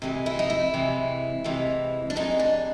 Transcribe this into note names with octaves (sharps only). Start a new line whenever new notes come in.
C3 E3 G#3
E4
D#4
E4
C3 E3 G#3
C3 E3 G#3
D4
C3 E3 G#3 D#4
D4